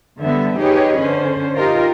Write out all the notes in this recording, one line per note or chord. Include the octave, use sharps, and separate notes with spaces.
D3 G3 B3 E5
D#4 G4 G#4 B4 C#5 D#5
D3 C#4 C5
D#4 F4 G4 A#4 D#5